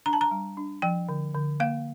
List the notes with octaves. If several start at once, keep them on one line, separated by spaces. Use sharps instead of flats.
D4 A#5
A5
A#5
G3
D4
F3 G5
D3
D3
A#3 F5